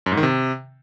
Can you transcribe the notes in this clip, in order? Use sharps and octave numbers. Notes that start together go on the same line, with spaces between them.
F#2
G#2
D#3
C3